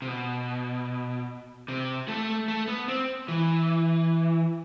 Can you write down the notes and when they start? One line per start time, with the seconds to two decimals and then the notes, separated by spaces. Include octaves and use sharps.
0.02 C3
0.08 B2
1.68 C3
2.08 A3
2.48 A3
2.68 B3
2.88 C4
3.28 E3